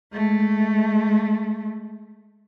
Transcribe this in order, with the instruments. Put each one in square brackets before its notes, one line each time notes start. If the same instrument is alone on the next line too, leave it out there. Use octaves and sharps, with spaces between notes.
[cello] G#3 A3